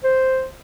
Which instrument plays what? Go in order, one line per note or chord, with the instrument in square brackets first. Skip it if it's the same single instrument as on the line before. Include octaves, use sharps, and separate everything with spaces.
[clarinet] C5